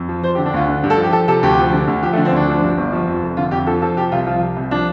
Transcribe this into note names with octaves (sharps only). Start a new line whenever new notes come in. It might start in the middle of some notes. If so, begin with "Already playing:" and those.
Already playing: F2
F3
F3 C5
G4
D3
D4
D2 F4
D3
G2
A4
F3
G4
F3 A4
C3 A4
D2 G4
F3
D3
D2
F3 G4
A3
D3
C4
D2 D4
F3
G2
G1
F3
F2
F1
D3 F4
F2 G4
F3 A4
F3 A4
C3 G4
C2 F4
F3 F4
C3
C2
F3 D4